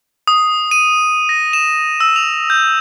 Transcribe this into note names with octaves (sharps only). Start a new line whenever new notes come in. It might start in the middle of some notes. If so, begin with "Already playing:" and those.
D#6
D#7
A#6
E7
E6
F7
G6